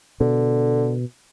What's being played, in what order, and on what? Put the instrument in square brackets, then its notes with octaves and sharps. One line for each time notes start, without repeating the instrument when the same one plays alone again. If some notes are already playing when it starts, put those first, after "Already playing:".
[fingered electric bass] B2 [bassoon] D3